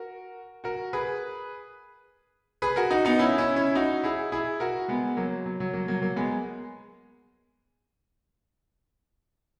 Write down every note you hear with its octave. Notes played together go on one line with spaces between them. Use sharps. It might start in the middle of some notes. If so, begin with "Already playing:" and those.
Already playing: F#4 A#4
F#4 A#4
G#4 B4
G#4 B4
F#4 A#4
D#4 F#4
B3 D#4
C#4 E4
C#4 E4
C#4 E4
D#4 F#4
E4 G#4
E4 G#4
F#4 A#4
G#3 B3
F#3 A#3
F#3
F#3
F#3 A#3
F#3 A#3
F#3 A#3
G#3 B3